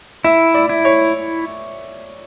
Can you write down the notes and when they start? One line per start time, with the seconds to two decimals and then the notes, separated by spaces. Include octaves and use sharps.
0.24 E4 E5
0.54 D5
0.69 E4
0.85 C#5